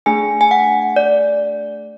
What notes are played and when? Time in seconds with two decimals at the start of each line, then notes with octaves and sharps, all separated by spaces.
0.06 A3 D4 G#4 G#5
0.41 G#5
0.51 F#5
0.96 D5